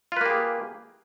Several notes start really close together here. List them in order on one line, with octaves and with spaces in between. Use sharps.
F4 B4 A#3 G4 G#4